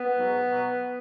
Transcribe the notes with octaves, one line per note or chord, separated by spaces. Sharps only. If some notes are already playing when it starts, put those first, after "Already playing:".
Already playing: B3
G#2 F#3
B2 F#3